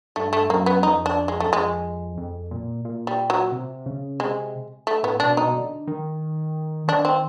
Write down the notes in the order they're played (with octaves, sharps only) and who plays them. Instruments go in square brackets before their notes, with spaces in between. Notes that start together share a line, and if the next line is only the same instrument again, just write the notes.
[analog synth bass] G2 [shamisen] A3
[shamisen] A3
[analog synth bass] F#2 [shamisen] A#3
[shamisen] B3
[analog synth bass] F2 [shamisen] D#4
[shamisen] D4
G#3
[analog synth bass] F#2 [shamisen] A3
[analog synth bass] F2 [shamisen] G#3
[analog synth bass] F2
A#2
A#2
[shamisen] G3
F#3
[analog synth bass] C3
C#3
[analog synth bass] C3 [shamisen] G#3
[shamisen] A3
[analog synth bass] A2 [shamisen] B3
[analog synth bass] B2 [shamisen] D4
[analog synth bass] B2 [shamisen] D#4
[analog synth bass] D3
D#3
[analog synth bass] D#3 [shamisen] D4
[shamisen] C4